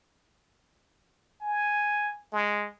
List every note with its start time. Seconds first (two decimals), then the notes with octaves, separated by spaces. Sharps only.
1.42 G#5
2.33 G#3